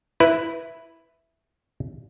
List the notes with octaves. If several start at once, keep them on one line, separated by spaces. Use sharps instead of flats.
E4 B4